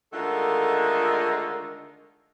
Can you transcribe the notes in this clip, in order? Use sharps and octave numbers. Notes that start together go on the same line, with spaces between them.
D3 D#3 G#3 A3 F4 A#4